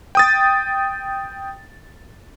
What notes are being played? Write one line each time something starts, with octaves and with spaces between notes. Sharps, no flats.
G5 D#6 A6